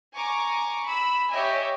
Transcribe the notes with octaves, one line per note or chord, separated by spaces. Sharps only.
G#5 A#5 C#6 D6
B5 E6
G4 C#5 D#5 E5 G#5